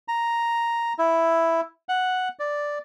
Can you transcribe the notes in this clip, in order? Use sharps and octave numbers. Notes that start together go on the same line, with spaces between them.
A#5
E4
F#5
D5